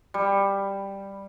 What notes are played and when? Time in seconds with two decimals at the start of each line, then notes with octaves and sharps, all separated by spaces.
0.14 G3